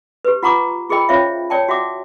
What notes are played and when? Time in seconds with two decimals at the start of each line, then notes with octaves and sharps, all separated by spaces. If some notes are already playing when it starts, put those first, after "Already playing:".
0.25 G4 B4
0.43 F4 F#5 A#5 C#6 D6
0.89 F4 G#4 A#4 D#5 G5 B5
1.09 C#4 F4 C5 C#5 E5 F5
1.50 C#5 D5 G5 A5
1.69 F#4 E5 F#5 D6